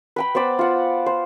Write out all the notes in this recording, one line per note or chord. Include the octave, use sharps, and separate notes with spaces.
B4 G5 B5
B3 C5 D5 B5
F4 F#5
C5